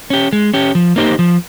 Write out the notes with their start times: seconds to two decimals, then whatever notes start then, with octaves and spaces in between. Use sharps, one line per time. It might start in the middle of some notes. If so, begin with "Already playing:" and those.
0.10 C#4 G4
0.33 G#3
0.54 C#4 G4
0.75 F3
0.96 A#3 D#4 G4 C5
1.19 F3